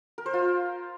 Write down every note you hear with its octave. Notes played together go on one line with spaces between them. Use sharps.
A#4
C5
F4